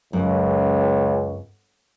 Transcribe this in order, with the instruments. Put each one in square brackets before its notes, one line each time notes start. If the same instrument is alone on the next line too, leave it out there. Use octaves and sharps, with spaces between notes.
[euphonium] C#2 [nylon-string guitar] F#2